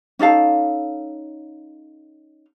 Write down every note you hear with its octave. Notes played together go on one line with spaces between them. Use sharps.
C#4 D#4 A4 F5